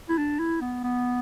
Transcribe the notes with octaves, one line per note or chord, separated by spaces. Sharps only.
E4
D4
E4
B3
B3